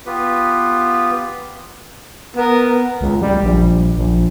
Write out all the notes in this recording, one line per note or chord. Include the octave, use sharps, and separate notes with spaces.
B3 F4 G4 B4
B3 A#4
C#2
G3
A#1
A#1